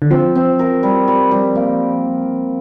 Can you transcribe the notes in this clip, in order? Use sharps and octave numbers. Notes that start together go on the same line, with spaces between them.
D3
F3 C4
C4
A#4
G3
G3
G3
A#3